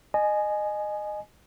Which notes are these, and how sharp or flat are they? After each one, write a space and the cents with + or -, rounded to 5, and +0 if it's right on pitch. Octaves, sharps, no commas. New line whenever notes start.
D#5 -25 G#5 +15